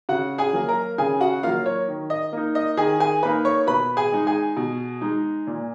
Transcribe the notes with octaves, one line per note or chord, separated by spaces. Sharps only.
C#3 F#4 F#5
G#4 G#5
F#3 A#3
A#4 A#5
C#3 G#4 G#5
F#4 F#5
F#3 A#3 F4 F5
C#5
D#3
D#5
A#3 D#4
D#5
D#3 G#4 G#5
G#4 G#5
A#3 D#4 B4 B5
C#5 C#6
B2 B4 B5
G#4 G#5
G#3 D#4
G#4 G#5
B2
G#3 D#4
A#2